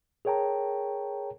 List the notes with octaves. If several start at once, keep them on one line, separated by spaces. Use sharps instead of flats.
G#4 A#4 C#5 G5 A5 A#5